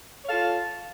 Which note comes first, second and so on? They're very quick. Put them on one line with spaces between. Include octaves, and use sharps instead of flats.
C#5 F5 A4 F4